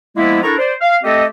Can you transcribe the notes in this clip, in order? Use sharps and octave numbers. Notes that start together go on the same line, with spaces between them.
F3 G#3 A#3 B3 E4
D4 E4 A4 A#4 A#5 C#6
C5 D5
F5
A3 C4 G4 A4 D#5